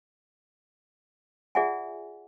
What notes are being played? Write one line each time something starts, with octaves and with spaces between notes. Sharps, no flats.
F4 G#4 D5 E5 F#5 G#5